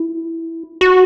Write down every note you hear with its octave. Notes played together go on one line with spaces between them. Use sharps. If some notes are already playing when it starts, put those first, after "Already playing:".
Already playing: E4
F#4